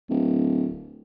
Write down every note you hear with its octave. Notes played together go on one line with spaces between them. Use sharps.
D1